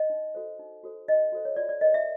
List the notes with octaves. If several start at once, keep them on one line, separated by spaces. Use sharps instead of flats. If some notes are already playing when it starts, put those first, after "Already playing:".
Already playing: D#5
D#4
F#4 A4 C5
D#4
F#4 A4 C5
D#4 D#5
F#4 A4 C5
C#5
F4 D5
D5
A#4 C#5 D#5
E5